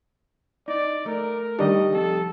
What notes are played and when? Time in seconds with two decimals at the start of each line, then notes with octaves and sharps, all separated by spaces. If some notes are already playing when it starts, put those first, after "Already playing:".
0.68 D#4 D5
1.06 A3 A#4
1.59 D#3 G3 D4 G4 D#5
1.92 F2 C3 A4